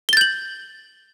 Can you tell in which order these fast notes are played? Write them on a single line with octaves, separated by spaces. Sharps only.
G7 A6 G6 F#7